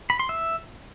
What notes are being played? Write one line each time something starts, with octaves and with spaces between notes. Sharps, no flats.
B5
C6
E5